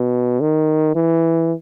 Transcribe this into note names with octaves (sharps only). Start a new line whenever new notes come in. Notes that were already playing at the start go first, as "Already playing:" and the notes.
Already playing: B2
D#3
E3